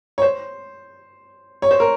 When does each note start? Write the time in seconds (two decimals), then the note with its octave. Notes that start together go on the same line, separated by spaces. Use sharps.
0.18 C#5
0.22 C5
1.62 C#5
1.71 C5
1.80 A#4